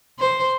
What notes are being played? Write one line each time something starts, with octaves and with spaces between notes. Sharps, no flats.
C5